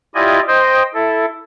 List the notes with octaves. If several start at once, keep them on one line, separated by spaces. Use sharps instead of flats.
E4 F4 G4 D5 D#5 G#5
C5 D#5 G5
E4 A4